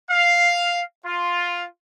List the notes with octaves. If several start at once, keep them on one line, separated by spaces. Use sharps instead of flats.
F5
F4